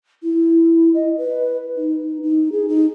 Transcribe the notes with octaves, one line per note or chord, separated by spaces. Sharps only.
E4
D#5
B4
D#4
D#4
G#4
D#4